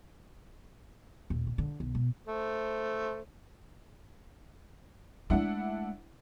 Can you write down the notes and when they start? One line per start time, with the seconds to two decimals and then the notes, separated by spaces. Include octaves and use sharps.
1.30 D#1
1.47 A2
1.58 D3
1.80 B1
1.95 B2
2.27 A3 C5
5.30 G#3 A3 D4 E4 F#5